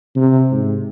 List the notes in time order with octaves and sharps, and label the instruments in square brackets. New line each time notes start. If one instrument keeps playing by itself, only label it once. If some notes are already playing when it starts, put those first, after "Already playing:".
[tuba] C3
G#2